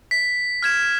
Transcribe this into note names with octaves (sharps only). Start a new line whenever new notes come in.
B6
F6 G#6 E7